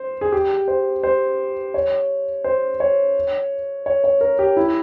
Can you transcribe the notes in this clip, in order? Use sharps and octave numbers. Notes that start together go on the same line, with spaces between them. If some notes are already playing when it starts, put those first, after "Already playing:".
Already playing: C5
G#4
G4
C5
C5
C#5
C5
C#5
C#5
C#5
A#4
G4
E4